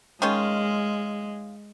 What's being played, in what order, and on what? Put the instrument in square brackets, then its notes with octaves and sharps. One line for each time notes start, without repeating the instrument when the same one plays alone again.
[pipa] D#3 C#4 F4 [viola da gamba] G#3